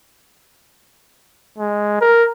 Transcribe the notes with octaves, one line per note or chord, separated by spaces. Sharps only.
G#3
A#4